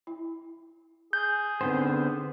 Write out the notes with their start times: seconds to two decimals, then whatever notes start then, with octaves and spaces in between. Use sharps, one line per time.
0.07 E4
1.13 G#4 G6
1.61 D3 B3 C4 D#4 B4 C5